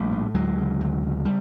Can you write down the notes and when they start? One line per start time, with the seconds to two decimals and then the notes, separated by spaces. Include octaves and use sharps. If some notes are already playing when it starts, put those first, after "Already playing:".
Already playing: A#1 G3 A3
0.11 A2
0.34 D2 F#3 G#3
0.58 C#3
0.81 D2
1.02 C#3
1.25 G3